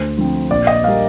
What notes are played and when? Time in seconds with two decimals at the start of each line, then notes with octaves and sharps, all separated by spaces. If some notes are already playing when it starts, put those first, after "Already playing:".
Already playing: D2 C5
0.17 D3 F3 C4
0.50 A#1 D5
0.67 D#5
0.84 G3 A#3 F5